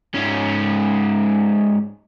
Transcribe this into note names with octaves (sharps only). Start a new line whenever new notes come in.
G#2 C#4